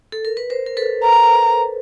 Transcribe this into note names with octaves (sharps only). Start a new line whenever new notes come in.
A4
A#4
B4
A#4 C5
A#4
A4 B4
A#5